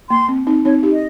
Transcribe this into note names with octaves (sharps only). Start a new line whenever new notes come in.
A#3 C6
C4
C4 D#4
C4 D#4 C#5
D#4 G4
D#5